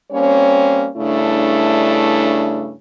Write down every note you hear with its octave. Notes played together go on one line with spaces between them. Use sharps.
G3 A#3 C4 C#4 C#5
G2 C#3 A3 D4 E4